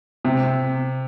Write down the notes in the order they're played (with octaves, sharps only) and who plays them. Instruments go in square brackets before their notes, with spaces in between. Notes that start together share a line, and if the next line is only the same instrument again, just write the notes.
[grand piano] C3